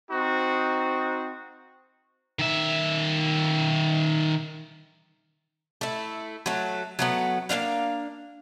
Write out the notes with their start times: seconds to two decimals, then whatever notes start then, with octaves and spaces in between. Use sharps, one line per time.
0.11 C4 D#4 F#4
2.39 D#3 E5
5.81 A3 E4
6.46 F#3 A3
6.99 F#3 A3 B3
7.49 A#3 C4 D4 F5